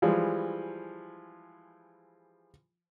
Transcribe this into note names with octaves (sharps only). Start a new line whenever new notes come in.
E3 F3 G3 G#3